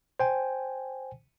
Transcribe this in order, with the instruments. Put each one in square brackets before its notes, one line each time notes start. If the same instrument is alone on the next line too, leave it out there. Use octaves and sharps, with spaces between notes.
[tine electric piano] C5 G5 G#5